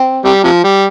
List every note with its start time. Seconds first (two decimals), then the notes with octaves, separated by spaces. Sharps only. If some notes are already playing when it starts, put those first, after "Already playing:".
Already playing: C4
0.25 C3 G3
0.44 C3 F3
0.64 G3